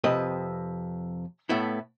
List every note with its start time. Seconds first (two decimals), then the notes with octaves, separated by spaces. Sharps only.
0.04 F2 C3 B4 D#5
1.49 A2 A3 B3 E4